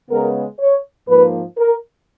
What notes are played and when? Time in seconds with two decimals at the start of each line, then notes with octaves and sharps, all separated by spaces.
0.10 C#3 G#3 B3 A#4
0.60 C#5
1.08 G#2 F3 A#3 B4
1.58 A#4